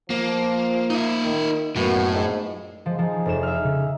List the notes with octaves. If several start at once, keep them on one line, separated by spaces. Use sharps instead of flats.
F3 A#3
D#4 E5
D#3
F#2 A2 A#3 B3 F#4
A#1 G#2 G#3
F3 G#3
F3 D#4 G#4
F1 E7
E5 F6
C#3